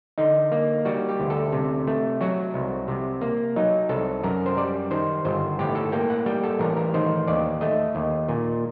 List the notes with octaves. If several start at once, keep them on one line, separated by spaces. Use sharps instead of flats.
D3 D#4
A#3
G3 F#4
G4
D2
A4
C3
A3
F#3 F#4
C2
C3
A#3
F#3 D#4
C2 A4
F#2 A#4
C5
G3 D5
D#3 C5
G1 C5
A2 G4
A4
A#3 G5
F#5
G3 G5
A4
A1 A#4
A#4
D#3 C5
D#2 D5
A3 D#5
D#2
A#2